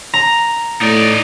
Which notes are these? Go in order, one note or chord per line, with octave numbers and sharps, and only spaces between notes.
A#5
A2 D#4 D5